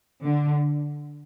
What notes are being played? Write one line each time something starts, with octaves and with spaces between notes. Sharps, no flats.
D3